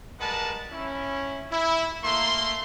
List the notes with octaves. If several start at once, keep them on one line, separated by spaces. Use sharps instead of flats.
G3 G#3 A#4 B4 F#5 A5
C#4 E4
E4
A3 A#3 C6